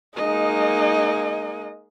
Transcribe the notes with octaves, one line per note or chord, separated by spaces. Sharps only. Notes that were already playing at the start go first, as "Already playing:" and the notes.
G#3 A#3 D#4 D#5